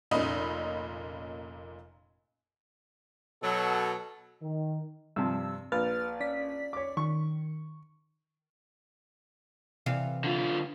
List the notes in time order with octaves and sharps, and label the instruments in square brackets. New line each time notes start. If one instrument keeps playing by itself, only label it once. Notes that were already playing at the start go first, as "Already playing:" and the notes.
[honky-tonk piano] F1 A#2 C#4 D#5 B5 D#6
[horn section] B2 F#3 [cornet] A4
[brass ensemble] D#3
[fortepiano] G2 C3 F3 [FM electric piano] E6
[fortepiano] A#1 [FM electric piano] B4 F6 A6
[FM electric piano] C#4 D5 B6
[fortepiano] C#5 D6
[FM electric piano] D#3 [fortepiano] C#6
[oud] C3 E3 F5
[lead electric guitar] D3 F4